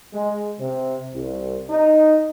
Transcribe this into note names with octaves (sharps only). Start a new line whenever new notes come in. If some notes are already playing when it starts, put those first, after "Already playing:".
G#3
C3
C2
D#4